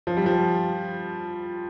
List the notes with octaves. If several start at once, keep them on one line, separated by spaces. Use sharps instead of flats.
F3
G3
F3